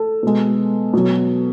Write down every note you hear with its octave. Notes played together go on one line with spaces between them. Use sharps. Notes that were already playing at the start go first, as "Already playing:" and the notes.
Already playing: A4
B2 G#3
B2 F#3